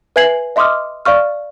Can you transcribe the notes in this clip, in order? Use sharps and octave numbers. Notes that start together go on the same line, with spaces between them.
B4 E5 G#5 G#6 C7 F#7
D#5 E5 C6 D6 D#6 F6
D5 F5 C#6 F6